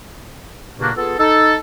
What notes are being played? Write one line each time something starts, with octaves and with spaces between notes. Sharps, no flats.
G2 A#2 C#3 A#3 D4 F#4
B3 F4 G#4 A4
D#4 A4